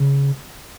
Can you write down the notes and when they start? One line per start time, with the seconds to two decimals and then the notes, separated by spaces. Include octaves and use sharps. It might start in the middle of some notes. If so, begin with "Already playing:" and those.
Already playing: C#3